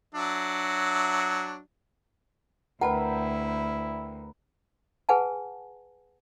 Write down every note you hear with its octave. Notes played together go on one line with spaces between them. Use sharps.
F#3 D4 E5
D2 E4 A#4 B4 F#5 G5 A5
G#4 B4 F#5 G#5 A5